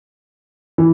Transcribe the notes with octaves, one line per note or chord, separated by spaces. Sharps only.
E3